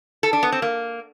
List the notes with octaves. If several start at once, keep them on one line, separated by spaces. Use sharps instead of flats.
A4
D4
B3
C4
A#3